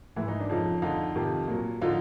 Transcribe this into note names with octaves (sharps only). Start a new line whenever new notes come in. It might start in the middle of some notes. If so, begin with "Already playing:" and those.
G#2 E3 E4
D#4
D4
F2 C#3 F3 D#4
F2 D3 F3 D#4 F4
F2 C3 D#3
A#2 F#3
D3 F3 D#4 F4